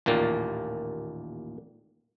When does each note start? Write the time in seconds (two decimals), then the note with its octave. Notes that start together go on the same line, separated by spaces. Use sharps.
0.06 A1 D#2 A#2 A#3